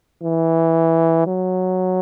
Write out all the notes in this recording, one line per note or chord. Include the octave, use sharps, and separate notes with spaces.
E3
F#3